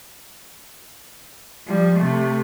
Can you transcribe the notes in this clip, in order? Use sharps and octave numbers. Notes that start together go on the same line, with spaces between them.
F3 G3
C3 A3